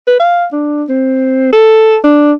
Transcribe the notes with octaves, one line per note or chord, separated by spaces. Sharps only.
B4
F5
D4
C4
A4
D4